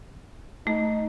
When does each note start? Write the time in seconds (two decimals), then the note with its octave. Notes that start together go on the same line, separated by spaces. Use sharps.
0.67 A3 D#4